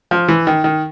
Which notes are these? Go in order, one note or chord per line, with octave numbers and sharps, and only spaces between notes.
F3
E3
D#3
D#3